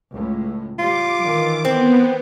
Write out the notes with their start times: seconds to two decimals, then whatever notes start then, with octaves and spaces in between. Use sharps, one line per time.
0.12 C#2 A2
0.79 G3 F4 D6
1.21 D#3 E3
1.65 B3 C4